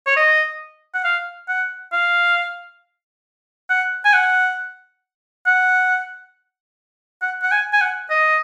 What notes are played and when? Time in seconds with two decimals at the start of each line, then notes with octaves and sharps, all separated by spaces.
0.07 C#5
0.16 D#5
0.94 F#5
1.04 F5
1.48 F#5
1.93 F5
3.70 F#5
4.05 G#5
4.13 F#5
5.46 F#5
7.22 F#5
7.43 F#5
7.52 G#5
7.73 G#5
7.81 F#5
8.10 D#5